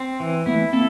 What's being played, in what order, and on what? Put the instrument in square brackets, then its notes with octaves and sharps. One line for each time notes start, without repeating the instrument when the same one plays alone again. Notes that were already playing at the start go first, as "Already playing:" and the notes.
Already playing: [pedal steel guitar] C4
E3
[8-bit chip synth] A3 B3 [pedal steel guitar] E4
[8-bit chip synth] A#3 C4 [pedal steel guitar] A4